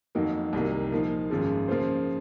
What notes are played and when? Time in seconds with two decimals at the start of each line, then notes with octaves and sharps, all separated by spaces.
0.15 F2 D#3 F#3 A#3 D#4
0.53 C2 C3 D#3 A#3
0.91 A#2 F3 A#3 D#4
1.30 G#1 F#2 F3 G#3
1.68 C#3 F3 A#3 F4 C5